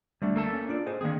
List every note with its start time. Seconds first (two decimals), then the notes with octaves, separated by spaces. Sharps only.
0.22 D2 G3 A3 D4
0.36 A#3 A4 A5
0.53 C#4
0.69 D4 F4 D5
0.86 G#4 C5 D#5
1.01 D3 D#3 A#3 C4 G#4